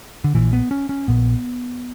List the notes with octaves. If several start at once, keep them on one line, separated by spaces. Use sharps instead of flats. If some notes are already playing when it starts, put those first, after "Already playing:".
D3
A#1 A#2 E3
B3
C#4
C#4
A#1 A#2 B3